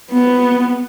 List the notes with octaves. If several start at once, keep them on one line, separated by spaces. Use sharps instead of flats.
B3